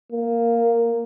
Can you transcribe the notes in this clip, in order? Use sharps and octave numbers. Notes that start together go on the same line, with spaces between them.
A#3